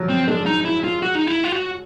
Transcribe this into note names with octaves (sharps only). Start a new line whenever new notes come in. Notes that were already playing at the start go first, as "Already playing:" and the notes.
Already playing: F3 F#3
C4
G#3 D4
D#4
E4
F4
F#4
D#4
E4
F4
F#4